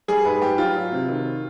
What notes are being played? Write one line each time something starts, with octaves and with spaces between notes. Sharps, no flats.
G3 G#4
G#2 B4
G3 G4
F#3 F4
F#3
C3
D#3